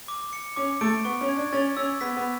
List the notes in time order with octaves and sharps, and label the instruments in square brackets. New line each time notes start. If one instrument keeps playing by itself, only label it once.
[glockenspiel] D6
C#7
[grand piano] C#4 [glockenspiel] D6
[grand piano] A3 [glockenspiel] D7
[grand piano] B3 [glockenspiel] C#6
[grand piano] C#4
[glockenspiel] G#6
[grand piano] D4
[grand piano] C#4 [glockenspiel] A6
[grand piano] C#4 [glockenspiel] E6
[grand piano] B3 [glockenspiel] B6
[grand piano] B3